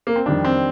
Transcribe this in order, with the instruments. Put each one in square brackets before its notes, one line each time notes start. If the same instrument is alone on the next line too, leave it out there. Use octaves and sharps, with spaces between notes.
[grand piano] A#3
C4
F2 D#3 G3 D4
C4